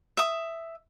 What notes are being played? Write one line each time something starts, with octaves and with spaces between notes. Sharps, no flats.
E5 D#6